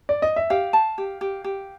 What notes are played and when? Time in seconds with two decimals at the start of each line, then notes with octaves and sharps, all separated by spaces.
0.09 D5
0.22 D#5
0.36 E5
0.50 G4 F5
0.73 A5
0.98 G4
1.21 G4
1.44 G4